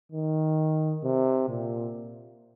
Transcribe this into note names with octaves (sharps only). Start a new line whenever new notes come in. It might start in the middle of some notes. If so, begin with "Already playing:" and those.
D#3
C3
A#2